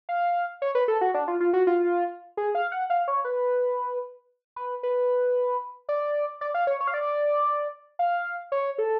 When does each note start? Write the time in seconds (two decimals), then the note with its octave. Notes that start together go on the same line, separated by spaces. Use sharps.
0.09 F5
0.62 C#5
0.75 B4
0.88 A4
1.01 F#4
1.14 D4
1.28 F4
1.40 F4
1.53 F#4
1.67 F4
2.37 G#4
2.55 F5
2.72 F#5
2.90 F5
3.08 C#5
3.24 B4
4.56 B4
4.83 B4
5.89 D5
6.41 D5
6.54 F5
6.67 C#5
6.81 C#5
6.87 F5
6.94 D5
7.99 F5
8.52 C#5
8.78 A4